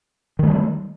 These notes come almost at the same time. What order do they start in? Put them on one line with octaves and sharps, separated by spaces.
D#3 A3 G3